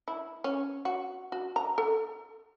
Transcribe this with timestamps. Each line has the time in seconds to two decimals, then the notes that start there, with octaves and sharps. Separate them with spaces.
0.08 E4
0.44 C#4
0.85 F#4
1.32 F#4
1.56 A#5
1.78 A4